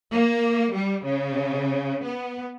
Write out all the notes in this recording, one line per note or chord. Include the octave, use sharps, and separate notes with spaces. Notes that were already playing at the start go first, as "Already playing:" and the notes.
A#3
G3
C#3
B3